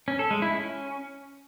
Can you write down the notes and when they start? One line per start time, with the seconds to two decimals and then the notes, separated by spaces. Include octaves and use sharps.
0.08 C#4
0.19 A4
0.31 G#3
0.42 E4
0.54 C#4